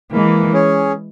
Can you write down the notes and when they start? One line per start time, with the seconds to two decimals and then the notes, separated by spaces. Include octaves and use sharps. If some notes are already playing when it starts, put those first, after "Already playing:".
0.12 E3 G#3 A#3
0.53 C#4 G#4 C#5